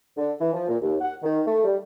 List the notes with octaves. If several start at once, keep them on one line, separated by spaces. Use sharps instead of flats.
D3
E3
F3
A#2
D#2
F#5
D#3
A3
G3